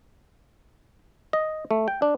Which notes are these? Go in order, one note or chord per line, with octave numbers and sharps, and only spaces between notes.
D#5
A3
G5
D4